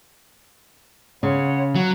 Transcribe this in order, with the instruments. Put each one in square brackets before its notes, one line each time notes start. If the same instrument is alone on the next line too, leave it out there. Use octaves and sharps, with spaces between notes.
[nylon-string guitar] C#3 [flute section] C#5 F#5 C6
[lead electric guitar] F#3 [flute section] F#4